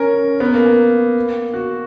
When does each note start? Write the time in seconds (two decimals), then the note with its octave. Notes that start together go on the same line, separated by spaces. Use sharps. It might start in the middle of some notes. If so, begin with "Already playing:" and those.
Already playing: C#4 A#4
0.40 B3
0.53 A#3
0.66 A#3
1.53 F#4